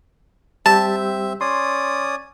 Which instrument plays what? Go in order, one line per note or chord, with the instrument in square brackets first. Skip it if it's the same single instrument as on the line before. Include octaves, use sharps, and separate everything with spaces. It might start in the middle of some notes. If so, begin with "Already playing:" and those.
[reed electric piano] G3 G4 [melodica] C4 E5 [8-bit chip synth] A5
[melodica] C#4 D5 D#6 [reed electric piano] C6